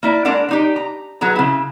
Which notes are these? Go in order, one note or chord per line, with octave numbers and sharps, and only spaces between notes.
A#3 E4 D5
G#3 D4 A#4 D5 F#5
D4 D#4 G4
A#5
F#3 B3 G#4 A#5
C#3 E4